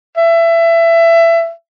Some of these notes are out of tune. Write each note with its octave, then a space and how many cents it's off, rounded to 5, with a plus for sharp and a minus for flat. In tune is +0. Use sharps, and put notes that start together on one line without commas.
E5 +20